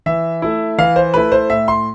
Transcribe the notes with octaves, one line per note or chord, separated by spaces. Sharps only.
E3 E5
A3 E4
E3 F5
C5
A3 E4 B4
C5
A2 E5
C6